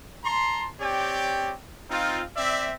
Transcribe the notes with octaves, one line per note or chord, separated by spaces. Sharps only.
A5 A#5 C6
C4 G4 C#5 D5 G5
C4 D#4 F4
C4 D5 E5